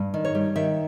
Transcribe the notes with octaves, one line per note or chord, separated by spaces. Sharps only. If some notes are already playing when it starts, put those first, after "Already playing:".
Already playing: G2
D#3
C#5
G3
D#3 E5